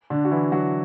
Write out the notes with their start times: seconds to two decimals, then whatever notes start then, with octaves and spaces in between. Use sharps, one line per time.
0.10 D3 D4
0.24 F#4
0.31 E3 E4
0.52 F#3 F#4